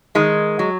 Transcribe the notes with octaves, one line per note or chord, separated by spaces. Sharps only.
D#3 G#3
F#3